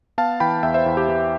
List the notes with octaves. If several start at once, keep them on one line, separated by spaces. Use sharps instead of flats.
B3 F5 A5
E3 G5 B5
E2 E5 G5
C5 E5
E2
G4
E3